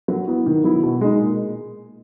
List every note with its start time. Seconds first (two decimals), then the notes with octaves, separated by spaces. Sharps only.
0.08 F#3
0.27 B3 E4
0.46 D#3
0.64 F#3 B3 E4
0.83 B2
1.01 G#3 D#4
1.20 A#2